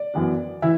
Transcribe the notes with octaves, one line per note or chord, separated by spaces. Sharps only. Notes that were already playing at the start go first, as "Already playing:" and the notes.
Already playing: D5
F#2 E3 B3 D4
E3 E4 E5